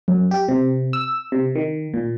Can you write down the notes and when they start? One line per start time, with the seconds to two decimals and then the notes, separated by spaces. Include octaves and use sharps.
0.08 F#2
0.31 G4
0.48 C3
0.93 E6
1.32 C3
1.55 D#3
1.94 A#2